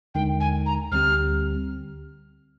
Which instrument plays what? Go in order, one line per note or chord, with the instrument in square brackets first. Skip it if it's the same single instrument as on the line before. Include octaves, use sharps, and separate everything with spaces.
[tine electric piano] D#2 D3 G#3 D#4 A#4 [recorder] G5
[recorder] G#5
A#5
[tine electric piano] D2 D3 G3 C4 G4 [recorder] F6